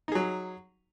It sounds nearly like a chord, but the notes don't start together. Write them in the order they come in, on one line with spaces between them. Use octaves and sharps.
D#4 G#4 F#3